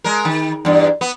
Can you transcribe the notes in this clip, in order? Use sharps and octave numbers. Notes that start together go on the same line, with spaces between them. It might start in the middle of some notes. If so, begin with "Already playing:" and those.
G#3 A#4
D#3
E2 G2
B3